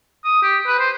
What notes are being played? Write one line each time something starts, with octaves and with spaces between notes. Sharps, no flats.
D#6
G4
B4
C5